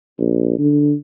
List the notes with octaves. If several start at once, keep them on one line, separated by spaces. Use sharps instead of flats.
A#1
D3